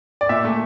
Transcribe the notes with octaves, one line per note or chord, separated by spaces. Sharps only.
D5
A#2 E5
A3